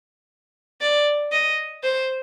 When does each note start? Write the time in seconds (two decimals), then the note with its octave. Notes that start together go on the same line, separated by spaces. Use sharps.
0.81 D5
1.32 D#5
1.83 C5